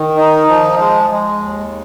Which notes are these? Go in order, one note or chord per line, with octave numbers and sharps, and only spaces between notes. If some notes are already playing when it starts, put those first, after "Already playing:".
Already playing: D#3
D#4
F3
G#3
G#3
D#2